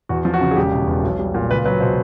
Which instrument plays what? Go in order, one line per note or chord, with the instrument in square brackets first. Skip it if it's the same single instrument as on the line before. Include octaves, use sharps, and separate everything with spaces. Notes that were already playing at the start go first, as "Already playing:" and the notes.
[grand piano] E2 F#4
F3
F#4
C#3
G#4
E1 G4
B2
E2
B1
G3
A#2
C#2 B4
F#3 B4
B2 C5